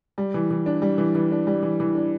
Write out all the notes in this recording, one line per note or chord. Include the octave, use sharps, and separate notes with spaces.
G3
E3
E3
D4
G3
E3
E3
D4
G3
E3
E3
D4